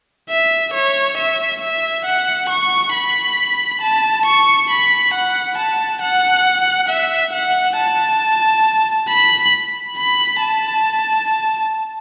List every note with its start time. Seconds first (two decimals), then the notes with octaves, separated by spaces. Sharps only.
0.30 E5
0.74 C#5
1.18 E5
1.62 E5
2.05 F#5
2.50 C#6
2.93 B5
3.82 A5
4.25 C#6
4.70 B5
5.13 F#5
5.58 A5
6.02 F#5
6.89 E5
7.33 F#5
7.78 A5
9.09 B5
9.98 B5
10.42 A5